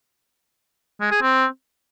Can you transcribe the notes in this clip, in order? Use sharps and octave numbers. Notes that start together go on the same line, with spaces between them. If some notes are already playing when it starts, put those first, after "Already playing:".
G#3
G#4
C4